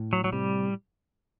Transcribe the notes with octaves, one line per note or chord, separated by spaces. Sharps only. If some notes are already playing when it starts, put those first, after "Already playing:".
Already playing: A2
F#3
F#3
C3 G3